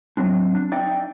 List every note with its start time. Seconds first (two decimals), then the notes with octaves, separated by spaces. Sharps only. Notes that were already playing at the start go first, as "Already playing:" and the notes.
0.17 F#3 C4 D4
0.55 D4
0.72 D#4 D5 E5 G5